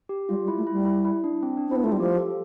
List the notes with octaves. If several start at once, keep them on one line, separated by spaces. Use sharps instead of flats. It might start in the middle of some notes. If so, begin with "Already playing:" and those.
G4
G3 F4
G3
E4
A3
E4
G3
E4
E4
D4
C4
D4
C4
B3 E4
A3 F4
G3
F3 G4
A4